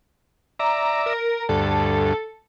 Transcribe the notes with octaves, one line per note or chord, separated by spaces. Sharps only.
D5 E5 A#5
A#4
D2 G2 A4